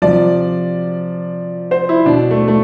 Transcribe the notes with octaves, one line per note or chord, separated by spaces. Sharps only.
C3 F3 D5
C5
E4
B2 D4
A3
A3